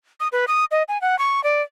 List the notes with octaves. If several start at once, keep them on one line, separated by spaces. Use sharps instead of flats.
D#6
B4
D#6
D#5
G#5
F#5
C#6
D5